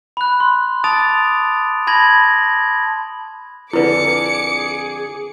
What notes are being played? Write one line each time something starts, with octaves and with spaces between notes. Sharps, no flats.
B5 F#6
C6
A5 D6 D#6 A6 D7 F7
A5 B5 G#6 A#6 F#7
F2 D3 E4 G#4 B4 D6 C#7